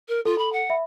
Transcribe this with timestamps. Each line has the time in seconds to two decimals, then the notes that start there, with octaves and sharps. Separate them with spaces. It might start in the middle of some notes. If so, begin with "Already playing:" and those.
0.09 A#4
0.25 F4 A4
0.38 B5
0.53 F#5
0.70 E5 B5